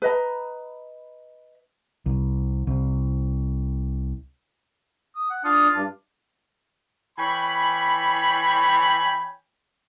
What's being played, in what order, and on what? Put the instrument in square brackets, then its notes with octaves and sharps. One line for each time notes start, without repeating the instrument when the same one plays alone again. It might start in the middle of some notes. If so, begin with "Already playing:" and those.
[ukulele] B4 D#5 A#5
[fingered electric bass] C2
C2
[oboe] D#6
F#5
[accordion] D4 D#6 [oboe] F4
[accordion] G2 D4
[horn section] E3 C#5 G5 G#5 B5